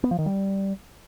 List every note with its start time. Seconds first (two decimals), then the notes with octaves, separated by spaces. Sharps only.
0.04 B3
0.11 F3
0.19 D#3
0.26 G3